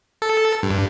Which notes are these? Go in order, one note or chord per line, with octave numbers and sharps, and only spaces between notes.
A4
G2